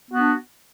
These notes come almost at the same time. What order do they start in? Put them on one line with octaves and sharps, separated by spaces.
B3 F#4 D4